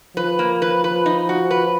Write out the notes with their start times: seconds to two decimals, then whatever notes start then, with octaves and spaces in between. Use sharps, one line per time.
0.16 F3 B4
0.39 A#3
0.62 B4
0.84 B4
1.06 D#4
1.29 F#4
1.51 B4